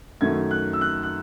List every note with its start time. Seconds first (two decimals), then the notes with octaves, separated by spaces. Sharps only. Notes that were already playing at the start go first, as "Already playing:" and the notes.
0.21 F#2 D#3 A3 G#6
0.51 F#6
0.73 E6
0.81 F#6
1.03 F#6